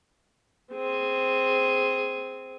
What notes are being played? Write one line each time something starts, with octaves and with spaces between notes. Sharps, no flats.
C4 G#4